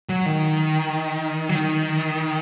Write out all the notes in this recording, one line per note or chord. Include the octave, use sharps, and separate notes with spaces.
F#3
D#3
F#3
D#3